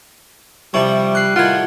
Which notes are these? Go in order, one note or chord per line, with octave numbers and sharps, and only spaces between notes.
C3 F3 G3 E4 G4 C5 C#6
F#6 C7
A2 D#3 G3 F4 F#5 G#6